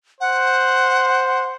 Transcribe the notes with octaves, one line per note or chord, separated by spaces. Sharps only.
C5 F#5